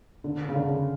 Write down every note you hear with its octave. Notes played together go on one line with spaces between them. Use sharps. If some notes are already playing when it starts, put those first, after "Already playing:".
D3
C#3
D3